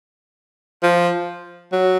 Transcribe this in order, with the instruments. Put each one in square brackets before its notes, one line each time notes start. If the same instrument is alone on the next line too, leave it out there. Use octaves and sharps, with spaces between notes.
[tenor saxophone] F3
F#3